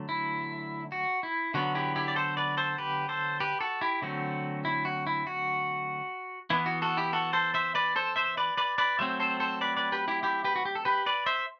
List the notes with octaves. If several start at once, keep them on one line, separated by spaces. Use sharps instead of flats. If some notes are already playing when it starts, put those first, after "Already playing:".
Already playing: D3 F#3 A3
E4
F#4
E4
D3 F#3 B3 F#4
E4 G4
E4 G4
D5
A4 C5
B4 D5
A4 C5
G4 B4
A4 C5
G4 B4
F#4 A4
E4 G4
D3 F#3 A3 C4 F#4
E4
F#4
E4
F#4
E3 B3 E4
F#4
F#4 A4
E4 G4
F#4 A4
A4 C5
C5 E5
B4 D5
A4 C5
C5 E5
B4 D5
B4 D5
B4 D5
F#3 A3 C4 C5 E5
A4 C5
A4 C5
B4 D5
B4 D5
G4 B4
E4 G4
E4 G4
G4 B4
F#4
G4
A4
G4 B4
B4 D5
C5 E5